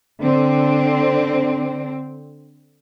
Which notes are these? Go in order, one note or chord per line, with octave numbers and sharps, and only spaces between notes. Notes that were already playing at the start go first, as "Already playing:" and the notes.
D3 C4